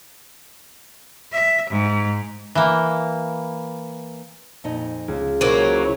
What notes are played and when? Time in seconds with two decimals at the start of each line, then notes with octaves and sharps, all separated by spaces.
1.32 E5
1.70 G#2
2.55 E3 A#3
4.64 F2 A#2 D#4
5.08 C#2
5.41 C#3 F#3 A#3 E4 A#4 C5 C#5